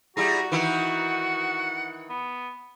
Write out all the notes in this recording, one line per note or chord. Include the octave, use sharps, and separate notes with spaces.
G3 E4 F#4 G#4 A#5
D#3 E3 E4 F#5
B3